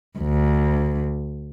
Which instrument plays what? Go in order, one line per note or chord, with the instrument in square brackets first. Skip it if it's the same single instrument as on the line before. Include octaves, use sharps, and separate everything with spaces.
[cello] D2